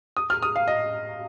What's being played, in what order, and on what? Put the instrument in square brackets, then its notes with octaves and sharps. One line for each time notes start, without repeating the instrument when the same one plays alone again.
[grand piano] D#6
F6
D#6
F5
D#5